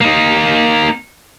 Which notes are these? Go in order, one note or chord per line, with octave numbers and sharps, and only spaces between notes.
A#3 D#4